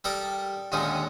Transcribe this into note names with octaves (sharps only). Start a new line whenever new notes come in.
G3 A4 A#4 B5 D6 D#6
D#2 A#2 D3 G#3 C#4 D#4